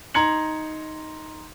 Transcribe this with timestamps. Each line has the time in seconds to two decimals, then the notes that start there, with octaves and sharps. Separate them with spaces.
0.14 D#4 A#5 C6 G#6 C#7 F#7